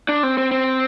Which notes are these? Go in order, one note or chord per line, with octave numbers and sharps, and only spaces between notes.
D4
C4
C4
C4